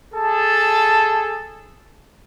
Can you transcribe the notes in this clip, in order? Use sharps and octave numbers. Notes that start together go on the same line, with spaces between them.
G#4 A4 A5